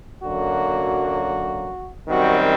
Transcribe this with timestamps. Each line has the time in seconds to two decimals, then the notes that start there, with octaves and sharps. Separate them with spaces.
0.24 F#2 D3 F#3 A#3 F#4
2.09 F#2 D#3 G3 C4 F#4